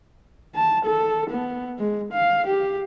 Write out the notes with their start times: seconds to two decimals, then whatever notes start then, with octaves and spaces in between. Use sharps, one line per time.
0.55 A5
0.85 A4
1.30 B3
1.79 G#3
2.13 F5
2.47 G4